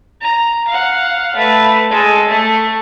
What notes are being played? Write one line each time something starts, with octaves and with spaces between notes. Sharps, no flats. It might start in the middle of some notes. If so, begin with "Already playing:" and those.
A#5
F5 F#5
A3 B4
G#3 A4
A3 C#6